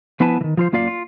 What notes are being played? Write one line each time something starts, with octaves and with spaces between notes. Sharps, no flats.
F3 B3 E4 B4 G#5 A5
D#3 E3
F3 F4 C5
F#2 A#3 F4 D5 F5
F4